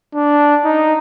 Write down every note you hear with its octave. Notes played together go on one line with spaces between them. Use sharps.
D4
D#4